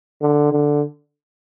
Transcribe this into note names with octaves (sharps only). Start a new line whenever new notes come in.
D3
D3